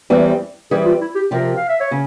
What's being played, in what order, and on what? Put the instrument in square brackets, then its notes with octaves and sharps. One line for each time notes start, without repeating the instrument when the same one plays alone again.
[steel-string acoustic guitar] E2 E3 G3 C4
[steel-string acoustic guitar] E3 G3 C4 [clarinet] G#4
[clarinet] F4
E4
G4
[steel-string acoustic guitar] C3 F3 C4 G4 [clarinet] A#4
[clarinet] F5
E5
C#5
[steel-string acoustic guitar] C#3